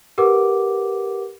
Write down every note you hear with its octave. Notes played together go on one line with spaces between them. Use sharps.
G4 A#4 B4 F#5 D6